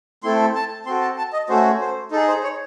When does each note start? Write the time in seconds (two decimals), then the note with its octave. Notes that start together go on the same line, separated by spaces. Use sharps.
0.23 A3 C4 E4 A4 C6
0.55 A5
0.86 C4 F#4 A4 C6
1.02 A5
1.18 A5
1.33 D#5
1.49 A3 C#4 F#4 C5
1.81 C5
2.11 D#4 A4
2.15 G#4
2.28 C5
2.43 C#5